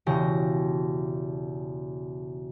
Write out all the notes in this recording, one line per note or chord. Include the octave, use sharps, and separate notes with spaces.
E1 C#3 G4 A#6